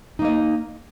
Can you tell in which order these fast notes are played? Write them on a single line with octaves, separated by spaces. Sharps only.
D#4 A#3 D#5